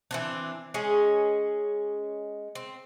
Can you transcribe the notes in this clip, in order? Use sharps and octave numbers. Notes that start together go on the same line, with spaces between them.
E3 C4 D4
G#3 C#4 G#4
C4